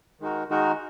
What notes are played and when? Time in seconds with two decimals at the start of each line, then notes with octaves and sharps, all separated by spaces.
0.20 D#3 G#3 D#4 F#4 A#4
0.49 D#3 G#3 D#4 F#4 A#4